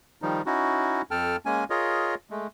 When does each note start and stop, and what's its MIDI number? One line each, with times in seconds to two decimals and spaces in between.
0.22 0.42 51
0.22 0.42 53
0.22 0.42 55
0.22 0.42 63
0.46 1.02 61
0.46 1.02 63
0.46 1.02 64
0.46 1.02 66
1.11 1.36 41
1.11 1.36 69
1.11 1.36 79
1.11 1.36 81
1.11 1.36 89
1.45 1.64 56
1.45 1.64 58
1.45 1.64 61
1.45 1.64 80
1.70 2.15 65
1.70 2.15 68
1.70 2.15 70
1.70 2.15 73
1.70 2.15 75
2.31 2.47 56
2.31 2.47 57